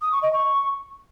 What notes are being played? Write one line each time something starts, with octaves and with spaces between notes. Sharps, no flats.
D#6
C#6
D#5
C#6